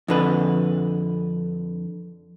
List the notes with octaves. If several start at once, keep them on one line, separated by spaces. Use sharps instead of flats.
F2 D3 B4